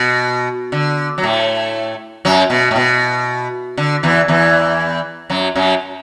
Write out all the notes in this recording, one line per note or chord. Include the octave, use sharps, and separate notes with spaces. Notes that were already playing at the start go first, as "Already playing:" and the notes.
Already playing: B2
D3
F#3
A2 A3
F#2 F#3
B2
A2
B2
D3
E2 E3
E2 E3
F#2 F#3
F#2 F#3